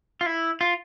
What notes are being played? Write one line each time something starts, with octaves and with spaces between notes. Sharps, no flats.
F4
E4
F4